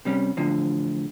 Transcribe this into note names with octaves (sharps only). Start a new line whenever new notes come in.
C3 G3 C#4
E2 A2 D3 F3